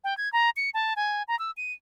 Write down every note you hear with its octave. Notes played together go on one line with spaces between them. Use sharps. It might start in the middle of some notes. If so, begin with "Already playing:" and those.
G5
G#6
A#5
C#7
A5
G#5
A#5
E6
D#7